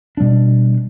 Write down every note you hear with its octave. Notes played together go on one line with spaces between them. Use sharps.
B2 G3 D4